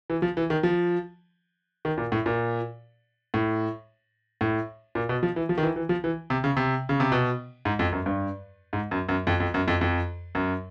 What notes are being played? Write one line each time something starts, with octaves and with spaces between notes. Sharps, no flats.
E3
F3
E3
D#3
F3
D#3
A#2
A2
A#2
A2
A2
A#2
B2
F3
E3
F3
D#3
E3
E3
F3
E3
C3
C#3
C3
C#3
C3
B2
G#2
F2
F#2
G2
G#2
F#2
F#2
F2
F2
F#2
F2
F2
F#2